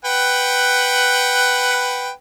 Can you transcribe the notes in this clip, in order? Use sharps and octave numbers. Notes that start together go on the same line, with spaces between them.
B4 F#5 G5